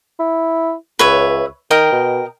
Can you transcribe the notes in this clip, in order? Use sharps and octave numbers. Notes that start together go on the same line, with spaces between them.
E4
C#2 B4 C#5 E5
D#3 A#4 D#5 G5
B2